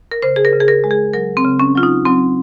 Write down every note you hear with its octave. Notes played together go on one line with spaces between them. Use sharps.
A#4
C#3 C5
G#4
A#4
C#3
G#4
A#4
G#3
G#4
F#3 A#4
C4
C#3
C#4
F#3 F4
D#4
F#3 C4